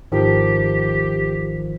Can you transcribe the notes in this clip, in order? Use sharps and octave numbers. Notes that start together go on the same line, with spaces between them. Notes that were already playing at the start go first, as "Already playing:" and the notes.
G#1 D#3 F3 G4